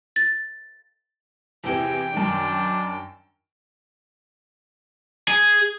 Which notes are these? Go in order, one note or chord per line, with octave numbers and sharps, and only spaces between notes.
A6
E2 C3 E3 G5
F#2 D#3 D4
G#4